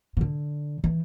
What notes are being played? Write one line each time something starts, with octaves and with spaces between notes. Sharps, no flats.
C3
D3
E3